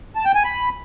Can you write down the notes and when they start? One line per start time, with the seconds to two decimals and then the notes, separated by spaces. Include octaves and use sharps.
0.16 A5
0.25 G5
0.35 G#5
0.44 B5